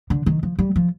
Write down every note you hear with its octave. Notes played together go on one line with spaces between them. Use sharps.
D3
D#3
F3
G3
F3